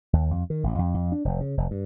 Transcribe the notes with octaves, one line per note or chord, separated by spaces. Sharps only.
D#2
F2
D#3
A1
F2
F2
D4
F1
C#3
F1
G2